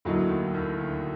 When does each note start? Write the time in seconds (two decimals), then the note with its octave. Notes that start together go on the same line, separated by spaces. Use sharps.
0.05 D2 A2 D3 F#3 A#3 D#4
0.29 D#2 D#3
0.54 D#2 D#3
0.78 D2 D3